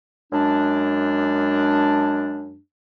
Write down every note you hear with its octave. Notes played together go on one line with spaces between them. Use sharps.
F#2 G#3 D4